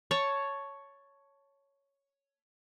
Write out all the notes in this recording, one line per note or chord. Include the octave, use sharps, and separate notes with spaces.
C#5 A5 C#6